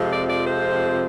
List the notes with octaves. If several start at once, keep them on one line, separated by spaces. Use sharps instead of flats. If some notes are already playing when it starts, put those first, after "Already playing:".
Already playing: F2 C3 F3 G#3
D5
D5
C5